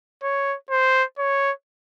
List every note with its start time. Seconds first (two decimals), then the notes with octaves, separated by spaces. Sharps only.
0.23 C#5
0.71 C5
1.18 C#5